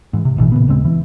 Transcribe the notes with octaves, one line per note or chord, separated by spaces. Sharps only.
G#2 E3
C3
A1 B2 D3 E3
A#2 C#3 B3
D#1 C#3 G#3 C4
E3